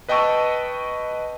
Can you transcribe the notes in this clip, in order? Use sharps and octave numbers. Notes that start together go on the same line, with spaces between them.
B4 D#5 G5 A5 C#6 E6